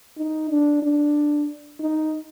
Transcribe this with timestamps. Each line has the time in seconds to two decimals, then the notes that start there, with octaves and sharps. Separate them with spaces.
0.18 D#4
0.50 D4
0.82 D4
1.80 D#4